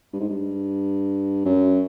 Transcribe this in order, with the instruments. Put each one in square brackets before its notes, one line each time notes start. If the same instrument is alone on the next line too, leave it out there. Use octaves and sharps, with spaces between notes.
[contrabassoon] G2
G#2
G2
F#2